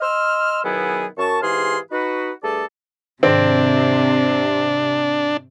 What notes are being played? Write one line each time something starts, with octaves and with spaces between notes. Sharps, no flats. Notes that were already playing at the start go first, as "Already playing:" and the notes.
D#5 C6 E6 F6
B2 D#3 F#3 B3 E4 G#4
F#2 A5 C#6
G#2 E3 G4 G#4 F5 C6
D#4 F#4 B4
G2 A3 G#4 A4 D5 A5
G#2 C3 D#3 C4 D4